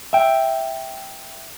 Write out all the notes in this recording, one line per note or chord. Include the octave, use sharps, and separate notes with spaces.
E5 G5